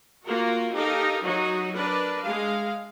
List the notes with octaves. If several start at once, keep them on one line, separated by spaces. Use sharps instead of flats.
A#3 F4 F#4 A#4
D#4 G4 A4 A#4 F5 A#5
F#3 D#4 F#4
D4 A#4 B4 D5
G#3 F5